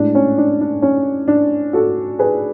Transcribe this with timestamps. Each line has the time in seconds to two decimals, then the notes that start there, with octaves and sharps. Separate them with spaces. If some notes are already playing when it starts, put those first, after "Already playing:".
Already playing: A2 G#3 D4
0.15 C#4
0.38 D4
0.61 D4
0.82 C#4
1.28 D4
1.73 F#4 A4
2.19 G#4 B4